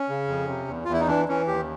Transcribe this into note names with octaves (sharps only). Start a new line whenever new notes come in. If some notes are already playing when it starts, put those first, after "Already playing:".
Already playing: C#4
C#3
F2
C3
E2
F4
E2
E4
D#4
E3 D4
E3 C#4
D#2 G4